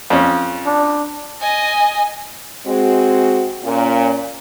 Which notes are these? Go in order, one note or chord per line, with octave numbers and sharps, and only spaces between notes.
F2 C#4
D4
D#5 G#5
G#3 C4 F#4
A#2 C#4